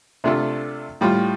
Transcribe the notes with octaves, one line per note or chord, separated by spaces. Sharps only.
C3 A3 D4 F4 A4
A2 G3 F4